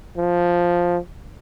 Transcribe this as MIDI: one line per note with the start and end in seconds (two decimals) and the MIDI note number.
0.17 0.97 53